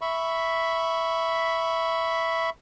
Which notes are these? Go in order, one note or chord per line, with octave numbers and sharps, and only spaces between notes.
E5 B5 C#6